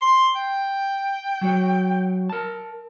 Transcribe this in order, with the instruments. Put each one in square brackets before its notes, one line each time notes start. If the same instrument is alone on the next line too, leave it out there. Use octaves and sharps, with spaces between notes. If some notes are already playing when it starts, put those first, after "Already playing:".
[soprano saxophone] C6
G5
[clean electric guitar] F#3 F#4 C#5
A#4 A5